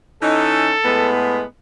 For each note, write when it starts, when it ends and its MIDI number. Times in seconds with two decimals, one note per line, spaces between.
0.22 0.73 52
0.22 0.73 61
0.22 0.73 63
0.22 1.21 69
0.84 1.43 45
0.84 1.43 56
0.84 1.43 59